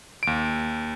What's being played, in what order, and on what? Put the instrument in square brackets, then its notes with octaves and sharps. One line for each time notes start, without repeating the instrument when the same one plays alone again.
[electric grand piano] D#2 D7